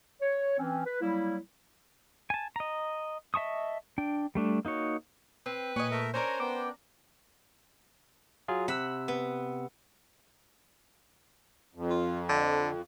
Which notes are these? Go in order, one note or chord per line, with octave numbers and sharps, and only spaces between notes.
C#5
E3 C4 C#4
B4
F#3 G3 A#3 E4
G#5 A5
D#5 A#5
D#5 E5 A5 C#6 D#6
D4 G5
G3 A3 D4
A#3 D#4 F#4 C#5
C4 B4
A#2 C#5 D#5 G#5 F#6
A3 A#4 E5
C#4 D4 A#4 C5 C#5 G#5 A#5
B3 G5 D6
F#3 F4 G#4
C3 F#5 B5 E6
B3
F2
F4
D3